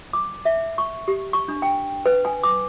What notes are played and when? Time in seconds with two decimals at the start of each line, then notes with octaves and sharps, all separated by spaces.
0.13 D6
0.45 E5
0.78 C#6
1.08 G4
1.33 C#6
1.48 D4
1.62 G5
2.06 B4
2.25 G#5
2.43 D6